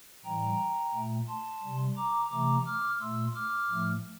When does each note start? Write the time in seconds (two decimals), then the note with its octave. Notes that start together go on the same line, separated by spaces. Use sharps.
0.25 A2 E3 G3 G5 A#5
0.94 A#2 A3
1.28 A5 C6
1.63 C3 G3
1.97 A#5 D6
2.31 C3 E3 A3 A#5 D6
2.66 D6 F6
3.00 A#2 A3 C6 E6
3.35 D6 F6
3.70 A2 F3 A3